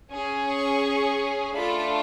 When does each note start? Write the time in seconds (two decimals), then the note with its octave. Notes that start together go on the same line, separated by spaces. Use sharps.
0.10 C#4 G#4
0.47 C#6
1.55 A3 D4 F4 A4 B5